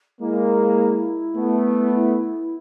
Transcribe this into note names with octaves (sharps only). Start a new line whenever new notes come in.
G#3 A#3 E4
A3 B3
E4